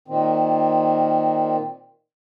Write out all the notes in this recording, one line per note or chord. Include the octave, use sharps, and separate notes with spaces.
A#2 D#3 C4